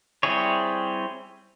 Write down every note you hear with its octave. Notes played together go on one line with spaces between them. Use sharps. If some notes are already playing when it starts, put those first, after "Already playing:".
G3 C4 E4 G#4 C#5